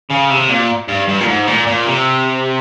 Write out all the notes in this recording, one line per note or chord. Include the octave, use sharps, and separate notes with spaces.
C#3
C3
A#2
G2
G2
A#2
G#2
A#2
A#2
C3